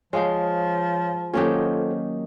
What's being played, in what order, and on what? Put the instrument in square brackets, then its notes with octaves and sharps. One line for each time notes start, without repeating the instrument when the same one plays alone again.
[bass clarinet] F3 [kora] G#3 [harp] F4 G#4 C5 [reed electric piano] C#5 F5
[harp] D#3 F#3 A#3 [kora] C#4 G4 [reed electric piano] F4 A4 C5